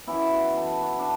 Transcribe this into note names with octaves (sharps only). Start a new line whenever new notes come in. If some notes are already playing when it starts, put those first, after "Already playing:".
F#2 E3 B3 E4
F#4
A4
F#4
D4